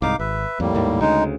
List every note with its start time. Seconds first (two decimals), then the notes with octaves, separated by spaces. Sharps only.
0.02 C2 G#2 D#4 F5 D6
0.20 G#1 B4 E5
0.60 F2 A2 G3 A#3
0.74 D#2 G#2 D#3
1.01 D2 C#3 G#3 D#4